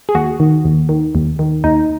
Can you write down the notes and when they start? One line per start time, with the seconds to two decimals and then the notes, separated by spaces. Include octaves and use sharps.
0.09 G#4
0.15 D#2 F#4
0.40 D#3
0.65 D#2
0.89 D#3
1.15 D#2
1.39 D#3
1.64 D#2 D#4